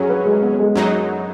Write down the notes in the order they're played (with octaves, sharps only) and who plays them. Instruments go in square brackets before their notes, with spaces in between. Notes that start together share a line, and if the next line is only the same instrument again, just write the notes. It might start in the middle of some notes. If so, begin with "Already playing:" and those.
Already playing: [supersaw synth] F#2 F#3 C#4 [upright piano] G#4 C#5
[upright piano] F#4 B4
G#3
B3
G#3
[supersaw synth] F#2 F#3 D#4